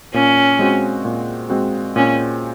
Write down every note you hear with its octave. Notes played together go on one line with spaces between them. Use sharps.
A#2 C#4
G#3 C4 F#4
A#2
G#3 C4 F#4
A#2 C#4